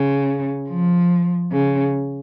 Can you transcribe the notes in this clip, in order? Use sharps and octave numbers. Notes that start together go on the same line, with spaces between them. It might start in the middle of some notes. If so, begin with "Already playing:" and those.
Already playing: C#3
F3
C#3